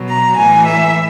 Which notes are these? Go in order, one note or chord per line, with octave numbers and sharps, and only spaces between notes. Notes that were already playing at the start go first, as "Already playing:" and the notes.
Already playing: B2 F#3
A#5
A2 E3 G#5
E5